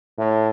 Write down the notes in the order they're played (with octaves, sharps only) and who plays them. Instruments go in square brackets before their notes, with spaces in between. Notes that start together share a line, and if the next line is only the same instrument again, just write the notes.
[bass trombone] A2